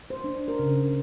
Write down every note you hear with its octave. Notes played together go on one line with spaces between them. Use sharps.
C5
D4
A#4
C#3